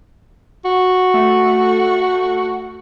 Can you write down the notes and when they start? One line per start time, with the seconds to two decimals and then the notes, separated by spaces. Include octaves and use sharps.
0.65 F#4
1.14 A3